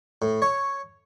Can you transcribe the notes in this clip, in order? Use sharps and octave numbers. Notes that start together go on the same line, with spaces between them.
A2
C#5